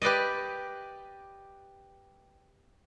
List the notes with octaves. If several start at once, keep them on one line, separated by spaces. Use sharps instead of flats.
G4 B4 D5 D#5